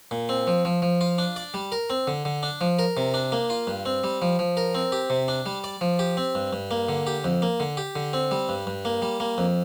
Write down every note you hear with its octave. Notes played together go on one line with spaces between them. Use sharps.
A#2
C4
F3
F3
F3
F4
D4
D5
G3
A#4
C4
D3
D3
D4
F3
A#4
C3
D4
A#3
F4
G2
C4
G3
F3
F3
A#4
C4
G4
C3
D4
G3
D5
F3
G4
C4
G2
G2
A#3
D3
G4
F2
A#3
D3
G4
D3
C4
G3
G2
G2
A#3
G3
A#3
F2